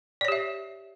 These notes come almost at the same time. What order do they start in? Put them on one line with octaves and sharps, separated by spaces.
D5 C#5 G4 E5